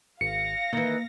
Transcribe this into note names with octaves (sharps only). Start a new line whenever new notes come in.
G#1 F5 A#6 C#7
D#3 E3 A#3